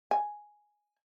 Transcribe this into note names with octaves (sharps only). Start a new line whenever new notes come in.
G#5